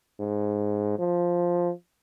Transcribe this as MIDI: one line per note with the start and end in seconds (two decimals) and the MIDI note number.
0.20 0.96 44
0.98 1.71 53